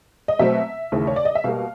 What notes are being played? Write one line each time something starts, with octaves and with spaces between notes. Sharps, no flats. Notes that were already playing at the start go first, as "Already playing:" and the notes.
D#5
B2 F#3 A3 C4 E5
D#2 C#3 E3 A3
C#5
D5
D#5
E5
B2 G3 A#3 F5